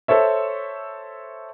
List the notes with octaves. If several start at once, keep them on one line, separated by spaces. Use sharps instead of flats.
A4 C5 C#5 E5